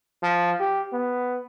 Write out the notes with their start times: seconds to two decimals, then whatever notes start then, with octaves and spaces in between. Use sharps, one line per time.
0.23 F3
0.60 G4
0.93 B3